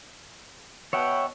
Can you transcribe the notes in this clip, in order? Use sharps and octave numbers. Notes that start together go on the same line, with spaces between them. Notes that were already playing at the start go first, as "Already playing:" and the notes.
B2 B3 C#5 E5 F#5 G5